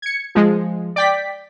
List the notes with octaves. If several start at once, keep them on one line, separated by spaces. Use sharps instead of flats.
G#6 C#7
F3 G#3
D5 G5 B6